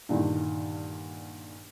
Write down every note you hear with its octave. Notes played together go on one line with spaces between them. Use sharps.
G2 A#2 D3 D#3